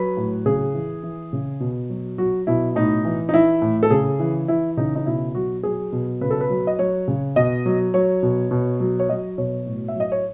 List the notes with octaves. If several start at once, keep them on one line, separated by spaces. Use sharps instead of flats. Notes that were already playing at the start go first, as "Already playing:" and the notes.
Already playing: F#3 B4
A2
C#3 G#4
E3
E3
C#3
B2
F#3
F#3 F#4
B2 E4
A2 D#4
E3
D#4
E3 E4
A2
A4
C#3 G#4
E3
E3 E4
C#3 D#4
D#4
B2 E4
F#3 F#4
F#3 G#4
B2
C#3 B4
A4
B4
F#3
D#5
F#3 C#5
C#3
B2 D#5
F#3
F#3 C#5
B2
B2
F#3
C#5
F#3 D#5
B2 C#5
A2
E5
F#3 D#5
C#5